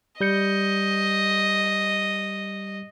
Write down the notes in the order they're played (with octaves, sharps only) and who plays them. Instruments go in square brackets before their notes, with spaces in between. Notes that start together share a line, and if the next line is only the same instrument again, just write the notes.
[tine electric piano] G3 G6 C#7 [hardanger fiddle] D#5